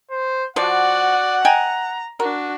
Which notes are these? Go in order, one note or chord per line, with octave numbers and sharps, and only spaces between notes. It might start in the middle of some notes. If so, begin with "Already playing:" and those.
C5
F3 F#4 D5 F#5
D#5 G5 G#5 A#5
D4 F#4 A#4